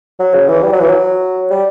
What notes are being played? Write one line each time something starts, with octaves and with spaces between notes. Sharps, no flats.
F#3
C#3
E3
G3
F#3
E3
F#3
G3